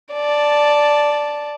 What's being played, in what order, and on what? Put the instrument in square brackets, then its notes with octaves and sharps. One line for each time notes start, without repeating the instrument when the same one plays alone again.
[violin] D5 A5